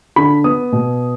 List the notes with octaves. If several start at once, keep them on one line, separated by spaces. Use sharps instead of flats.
D3 B5
B3 D#6
B2